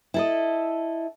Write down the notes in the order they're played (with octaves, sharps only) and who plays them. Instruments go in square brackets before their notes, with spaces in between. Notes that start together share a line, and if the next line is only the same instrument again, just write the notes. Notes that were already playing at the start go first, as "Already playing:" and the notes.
[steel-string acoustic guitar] E4 A4 D#5